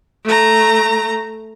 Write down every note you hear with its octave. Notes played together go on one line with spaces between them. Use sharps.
A3 A#5